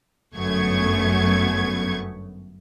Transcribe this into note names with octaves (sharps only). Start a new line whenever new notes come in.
G1 F#2 A3 B3 C#6 G#6